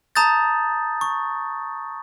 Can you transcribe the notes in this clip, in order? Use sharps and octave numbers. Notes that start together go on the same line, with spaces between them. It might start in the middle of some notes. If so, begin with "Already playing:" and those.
A5 A#5 D#6 G6 A6
C#6